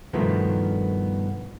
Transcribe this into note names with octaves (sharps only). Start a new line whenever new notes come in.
G2 B2 D#3 F3 A3 B3